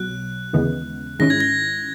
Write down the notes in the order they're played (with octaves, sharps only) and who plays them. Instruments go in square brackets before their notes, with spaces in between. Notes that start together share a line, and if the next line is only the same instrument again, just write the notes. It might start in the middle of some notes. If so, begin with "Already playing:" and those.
Already playing: [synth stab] B1 B2 F#3 [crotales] F#6
[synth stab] D#2 C#3 E3 G#3 B3
[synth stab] G#2 D#3 G#3 C#4 E4 [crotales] A#6
[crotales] G#6
A#6